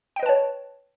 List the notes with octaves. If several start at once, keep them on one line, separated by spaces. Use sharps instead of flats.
B4 C#5 D#5 G5 A5